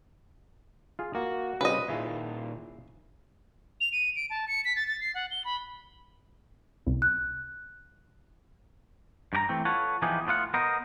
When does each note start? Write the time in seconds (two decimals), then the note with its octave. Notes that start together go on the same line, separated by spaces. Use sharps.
0.99 F4 G#4
1.15 A#3 F#4
1.61 C#3 G3 C4 B4 D#5
1.88 A#2 D#3 E4 F4 G#4
3.81 F7
3.93 D#7
4.16 D7
4.30 A5
4.48 C#7
4.65 B6
4.76 A6
4.88 A6
5.01 C7
5.15 F#5
5.31 G7
5.45 B5
6.86 C2
7.02 F#6
9.33 G2 G4 A#5
9.49 E3 A3 C4
9.65 F4 A4 B4 C#5 F#5
10.02 E3 F3 B3 D#4 G4 G#4
10.27 A2 B3 F4 F#5
10.54 B3 A#4 C5 D#5